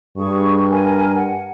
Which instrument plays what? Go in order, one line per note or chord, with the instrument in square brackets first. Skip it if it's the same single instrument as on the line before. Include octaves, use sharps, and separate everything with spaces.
[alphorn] G2 [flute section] G#4 C#6
[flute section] A#4 G#5
F#5